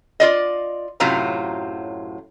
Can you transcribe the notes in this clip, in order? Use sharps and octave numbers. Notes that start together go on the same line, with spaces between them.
F4 D5 D#5
F#2 A2 C3 F#3 F4 A#5